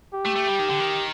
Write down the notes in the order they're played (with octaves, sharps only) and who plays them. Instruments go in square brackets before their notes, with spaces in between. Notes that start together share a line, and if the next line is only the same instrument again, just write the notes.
[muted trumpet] G4
[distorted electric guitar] A3
A3
G3
D#3
D3
D#3